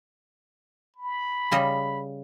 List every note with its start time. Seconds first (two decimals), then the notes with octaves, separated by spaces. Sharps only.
0.96 B5
1.51 C#3 G3 D#5